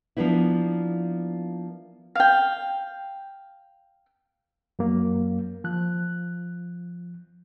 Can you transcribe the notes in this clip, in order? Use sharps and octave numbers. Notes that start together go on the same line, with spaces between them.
F3 A#3 B3 D4 E4
F5 G5
F#2 F#3 A#3
F3 F#6